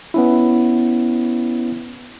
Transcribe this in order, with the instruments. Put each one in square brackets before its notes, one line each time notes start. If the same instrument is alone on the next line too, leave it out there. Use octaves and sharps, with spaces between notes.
[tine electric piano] B3 C#4 E4